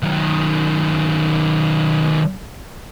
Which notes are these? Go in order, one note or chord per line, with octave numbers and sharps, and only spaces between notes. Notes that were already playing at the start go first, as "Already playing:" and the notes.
D#3 F#3